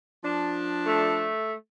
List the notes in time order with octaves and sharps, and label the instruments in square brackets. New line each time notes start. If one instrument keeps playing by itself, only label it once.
[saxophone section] F3 D4
[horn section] A3